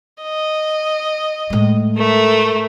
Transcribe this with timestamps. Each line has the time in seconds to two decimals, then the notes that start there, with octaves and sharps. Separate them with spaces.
0.23 D#5
1.50 A2 G#3
1.98 A3 A#4